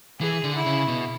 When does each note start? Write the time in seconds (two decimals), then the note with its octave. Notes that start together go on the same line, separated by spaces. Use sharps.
0.20 E3 G#4
0.44 D3
0.55 E4
0.66 C#3
0.88 B2